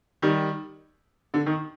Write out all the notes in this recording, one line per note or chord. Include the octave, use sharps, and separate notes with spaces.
D#3 G3
D3
D#3